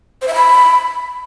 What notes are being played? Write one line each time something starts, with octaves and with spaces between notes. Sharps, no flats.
C5
E5
B5